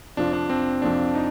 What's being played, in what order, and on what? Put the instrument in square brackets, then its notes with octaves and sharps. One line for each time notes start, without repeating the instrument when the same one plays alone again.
[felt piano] F2 C3 F3 [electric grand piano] D4
[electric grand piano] D4
C4
[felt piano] F2 C3 F3 [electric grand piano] D4
[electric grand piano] D#4